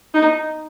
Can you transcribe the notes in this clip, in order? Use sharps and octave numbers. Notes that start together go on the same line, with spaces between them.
D#4